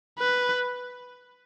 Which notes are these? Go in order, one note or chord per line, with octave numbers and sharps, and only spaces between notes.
B4